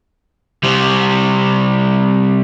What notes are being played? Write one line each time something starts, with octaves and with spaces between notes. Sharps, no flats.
C3 G3